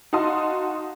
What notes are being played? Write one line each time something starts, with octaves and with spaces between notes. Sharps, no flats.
D#4 F#4 F5 A5 C6 D#6